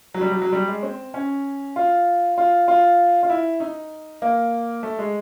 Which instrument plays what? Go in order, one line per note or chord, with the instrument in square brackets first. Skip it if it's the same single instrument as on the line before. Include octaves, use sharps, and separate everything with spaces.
[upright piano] F#3
G3
F#3
F#3
G3
G#3
C4
C#4
F4
F4
F4
F4
E4
D#4
A#3
A3
G#3